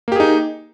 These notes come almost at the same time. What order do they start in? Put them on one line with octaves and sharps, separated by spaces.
A#3 G4 G#4 D#4